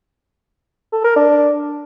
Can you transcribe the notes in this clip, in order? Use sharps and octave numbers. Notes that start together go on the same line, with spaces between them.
A4
A#4
D4